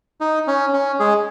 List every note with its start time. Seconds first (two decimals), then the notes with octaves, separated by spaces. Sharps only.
0.21 D#4
0.47 C#4
0.73 C#4
1.00 G#3 G#4